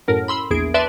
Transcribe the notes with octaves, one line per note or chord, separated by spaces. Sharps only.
F#2 A2 A#4
B5 C6 E6
A#1 E2 G#4 D7
B4 D5 E5 A5 C6